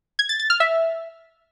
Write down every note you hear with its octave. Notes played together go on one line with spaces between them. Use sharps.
G#6
A6
A6
F6
E5